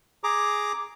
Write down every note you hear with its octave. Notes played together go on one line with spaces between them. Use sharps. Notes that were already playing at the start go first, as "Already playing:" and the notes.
G#4 A#5 D6